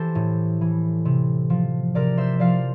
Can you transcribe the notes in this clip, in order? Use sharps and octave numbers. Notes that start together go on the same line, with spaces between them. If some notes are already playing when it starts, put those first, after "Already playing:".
Already playing: E3 G4 A4 C5
A2
E3
C3
F3
C3 A#4 D5
C5 E5
F3 D5 F5